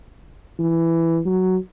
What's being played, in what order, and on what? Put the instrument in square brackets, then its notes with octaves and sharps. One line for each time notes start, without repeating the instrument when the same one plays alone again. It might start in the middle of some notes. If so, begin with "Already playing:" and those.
[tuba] E3
F#3